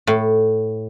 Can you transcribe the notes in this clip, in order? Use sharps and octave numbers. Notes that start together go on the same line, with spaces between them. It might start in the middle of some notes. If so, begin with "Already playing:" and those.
A2